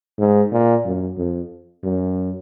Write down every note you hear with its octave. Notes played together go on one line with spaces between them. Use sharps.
G#2
A#2
F#2
F2
F#2